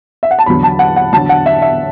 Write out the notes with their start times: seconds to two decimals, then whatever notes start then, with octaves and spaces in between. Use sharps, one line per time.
0.23 E5
0.31 F#5
0.39 A5
0.46 E2 D3 F#3 B5
0.63 A5
0.79 F#5
0.96 F#5
1.12 E2 D3 F#3 A5
1.29 F#5
1.46 E5
1.62 E5